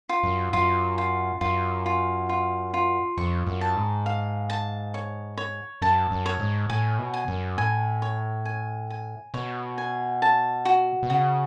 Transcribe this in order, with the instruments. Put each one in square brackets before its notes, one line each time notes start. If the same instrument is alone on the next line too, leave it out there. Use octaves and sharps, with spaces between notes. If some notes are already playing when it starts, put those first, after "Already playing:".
[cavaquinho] F4
[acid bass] F#2
[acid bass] F#2 [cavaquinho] F4
[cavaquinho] F4
[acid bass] F#2 [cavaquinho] F4
[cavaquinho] F4
F4
F4
[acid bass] F2 [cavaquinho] C#6
[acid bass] F#2
[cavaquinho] A5
[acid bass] G#2
[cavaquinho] F5
A5
C#5
C#5
[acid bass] F#2 [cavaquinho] A5
[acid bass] F#2
[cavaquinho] C#5
[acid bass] G#2
[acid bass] A2 [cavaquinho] G#5
[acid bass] B2
[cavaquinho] G#5
[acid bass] F#2
[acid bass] A2 [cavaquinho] G#5
[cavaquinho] C#5
G#5
G#5
[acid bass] B2 [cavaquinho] C#5
[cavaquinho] G#5
A5
F#4
[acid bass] B2
[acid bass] C#3 [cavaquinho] F#4